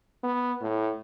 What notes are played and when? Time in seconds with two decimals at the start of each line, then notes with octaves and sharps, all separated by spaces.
0.23 B3
0.61 A2